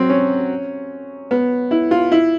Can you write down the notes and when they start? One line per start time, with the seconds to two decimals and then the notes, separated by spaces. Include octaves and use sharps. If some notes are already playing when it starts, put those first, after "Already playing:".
Already playing: F#3 C4
0.09 C#4
1.31 B3
1.71 E4
1.91 F4
2.12 E4